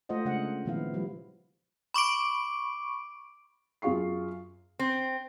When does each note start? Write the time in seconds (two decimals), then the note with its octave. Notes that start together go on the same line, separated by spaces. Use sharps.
0.09 A3 F4 C5 D#5 F#5
0.25 C#3 G#3 A3 D4 F#5
0.65 A#2 D#3 F3 B3 E4 F5
0.94 F3 G3 E4
1.94 B5 C#6 D6 D7
3.82 F#2 F4 G#4 F5 C#6 C7
4.79 C4